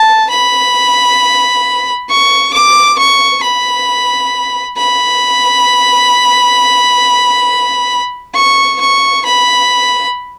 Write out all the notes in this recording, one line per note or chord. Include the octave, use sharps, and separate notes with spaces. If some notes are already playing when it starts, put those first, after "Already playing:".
Already playing: A5
B5
C#6
D6
C#6
B5
B5
C#6
C#6
B5